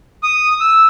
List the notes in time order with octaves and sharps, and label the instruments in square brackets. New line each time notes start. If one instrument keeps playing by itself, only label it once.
[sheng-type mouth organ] D#6
E6